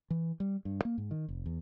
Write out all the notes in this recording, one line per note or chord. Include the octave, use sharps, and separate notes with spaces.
E3
G3
G2
A#3
G#2
D#3
F1
E2